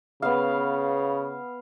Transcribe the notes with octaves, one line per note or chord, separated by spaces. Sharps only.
C#3 B3 F5